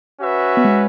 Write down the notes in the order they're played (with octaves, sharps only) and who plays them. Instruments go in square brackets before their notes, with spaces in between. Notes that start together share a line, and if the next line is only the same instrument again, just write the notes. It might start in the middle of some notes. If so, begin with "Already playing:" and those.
[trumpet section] C#4 F#4 B4 E5
[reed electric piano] B3
G#3